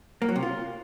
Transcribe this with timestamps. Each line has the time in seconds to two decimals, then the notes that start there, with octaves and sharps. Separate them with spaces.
0.22 A#3
0.29 F#3
0.36 C3
0.43 F4